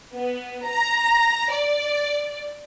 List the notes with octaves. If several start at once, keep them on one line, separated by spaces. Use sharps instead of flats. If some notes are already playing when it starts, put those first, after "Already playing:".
B3
A#5
D5